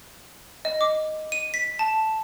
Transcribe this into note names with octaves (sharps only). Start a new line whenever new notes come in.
D#5
D6
D#7
B6
A5